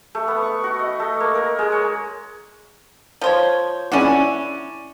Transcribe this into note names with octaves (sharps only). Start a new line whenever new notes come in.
A3
B3
C#6
F#4
D#5
A3
A#3
A#4
G#3
C#5
F3 C5 C#5
C#4 D4 E4 F#4